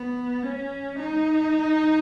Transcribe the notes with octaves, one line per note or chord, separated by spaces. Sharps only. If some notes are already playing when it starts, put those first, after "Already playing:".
Already playing: B3
C#4
D#4